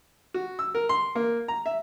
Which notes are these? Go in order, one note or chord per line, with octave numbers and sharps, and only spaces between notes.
F#4
E6
A#4
C6
A#3
A#5
E5